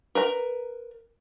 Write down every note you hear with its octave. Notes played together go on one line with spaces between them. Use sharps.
A#4 B4 A#5